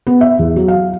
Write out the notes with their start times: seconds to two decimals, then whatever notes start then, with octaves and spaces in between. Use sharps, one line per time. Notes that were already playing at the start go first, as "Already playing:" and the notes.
0.07 B3
0.21 E5
0.39 E2
0.56 F#3
0.68 F5